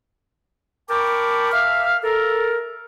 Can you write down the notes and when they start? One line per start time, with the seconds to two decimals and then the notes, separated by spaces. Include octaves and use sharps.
0.90 A#4 G5 A5 B5 C#6 D6
1.52 E5 F5 F6
2.04 A4 A#4